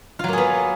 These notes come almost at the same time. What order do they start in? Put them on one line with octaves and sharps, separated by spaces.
F4 F#3 A#3 G#4 B3